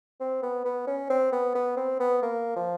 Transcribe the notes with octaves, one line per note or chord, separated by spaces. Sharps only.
C4
B3
B3
C#4
C4
B3
B3
C4
B3
A#3
F3